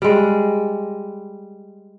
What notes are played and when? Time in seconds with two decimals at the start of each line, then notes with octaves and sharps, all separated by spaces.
0.02 G3 G#3